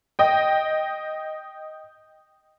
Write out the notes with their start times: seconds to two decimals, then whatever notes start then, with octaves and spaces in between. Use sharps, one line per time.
0.19 D#5 G5